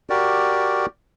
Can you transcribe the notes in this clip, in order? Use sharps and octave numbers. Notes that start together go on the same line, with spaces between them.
F#4 G4 A#4 D5